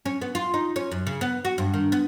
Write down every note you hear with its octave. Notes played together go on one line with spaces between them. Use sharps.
C#4
B3
F4
D#4
C#4
F#2
C#3
B3
F#4
G2
D#3
B3